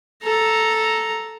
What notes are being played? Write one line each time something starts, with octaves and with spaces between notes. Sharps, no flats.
A4 A#5